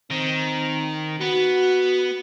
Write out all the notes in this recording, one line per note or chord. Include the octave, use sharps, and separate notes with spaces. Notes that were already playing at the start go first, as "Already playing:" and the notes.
D#3 C4
B3 F#4